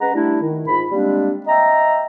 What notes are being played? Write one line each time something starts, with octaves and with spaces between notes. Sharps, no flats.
G#3 C#4 B4 F#5 A#5
G3 A3 D4 E4
D#3
G#2 F4 B5
G3 G#3 A#3 C4 D4
D#5 E5 G5 A#5